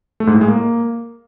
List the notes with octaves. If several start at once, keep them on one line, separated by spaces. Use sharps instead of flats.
A3
G#2
A2
G#3
A#3